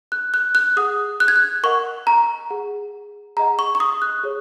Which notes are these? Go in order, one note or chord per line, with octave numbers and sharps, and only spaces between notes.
F#6
F#6
F#6
G#4 F#5 D#6
F#6
G#6
F#6
A#4 D#5 F#5 C#6
A#5
G#4 F#5
G#4 D#5 F#5 A#5
C#6
C#6
D#6
F#6
G#4 C#5